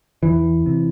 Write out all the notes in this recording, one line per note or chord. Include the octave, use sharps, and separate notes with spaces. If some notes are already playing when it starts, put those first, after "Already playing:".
E2 E3
C3